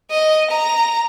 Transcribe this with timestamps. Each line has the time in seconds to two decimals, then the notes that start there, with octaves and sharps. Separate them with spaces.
0.11 D#5
0.50 A#5